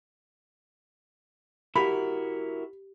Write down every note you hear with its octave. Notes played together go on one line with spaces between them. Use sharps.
E4 F#4 G4 A#4 B5